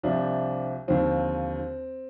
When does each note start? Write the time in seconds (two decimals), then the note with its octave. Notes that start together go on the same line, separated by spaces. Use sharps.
0.03 C2 C3 F3 D4
0.88 D#2 D3 F3 C4